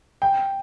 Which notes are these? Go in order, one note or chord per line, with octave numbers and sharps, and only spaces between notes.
G5